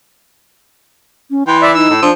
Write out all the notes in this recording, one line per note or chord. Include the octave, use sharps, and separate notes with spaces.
C#4
E3 G5 C6
D5 E5
D#4 E6
A2
F3 D4